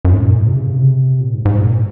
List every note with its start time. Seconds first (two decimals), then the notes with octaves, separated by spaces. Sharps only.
0.05 F#2
0.13 G#2
0.21 A#2
0.38 G#2
0.47 C3
0.56 C#3
0.71 C3
1.21 A#2
1.34 G#2
1.45 G#2
1.59 A#2